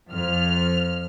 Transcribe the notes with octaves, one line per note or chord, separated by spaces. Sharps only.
F2 F6